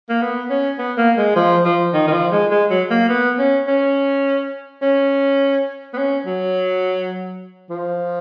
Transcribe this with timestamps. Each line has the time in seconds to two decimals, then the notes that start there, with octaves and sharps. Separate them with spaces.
0.09 A#3
0.22 B3
0.50 C#4
0.79 B3
0.97 A#3
1.18 G#3
1.36 F3
1.65 F3
1.94 D#3
2.08 D#3
2.13 F3
2.32 G#3
2.51 G#3
2.70 F#3
2.90 A#3
3.09 B3
3.38 C#4
3.67 C#4
4.82 C#4
5.94 B3
5.98 C#4
6.26 F#3
7.70 F3